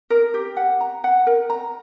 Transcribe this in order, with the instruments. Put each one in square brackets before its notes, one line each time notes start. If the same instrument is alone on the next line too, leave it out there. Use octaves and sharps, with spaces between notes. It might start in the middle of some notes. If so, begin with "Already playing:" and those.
[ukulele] A#4
G4
F#5
A#5
F#5
A#4
A#5